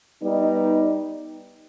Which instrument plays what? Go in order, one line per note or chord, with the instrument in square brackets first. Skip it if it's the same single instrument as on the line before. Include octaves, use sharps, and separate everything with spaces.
[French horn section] G3 B3 D#4